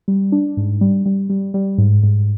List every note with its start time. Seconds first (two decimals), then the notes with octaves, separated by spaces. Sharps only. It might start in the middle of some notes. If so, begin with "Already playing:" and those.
0.08 G3
0.32 D4
0.57 G#2
0.81 G3
1.06 G3
1.30 G3
1.54 G3
1.78 G#2
2.03 G#2